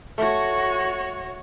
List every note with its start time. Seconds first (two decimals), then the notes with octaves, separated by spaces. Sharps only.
0.18 A3 F#4 C#5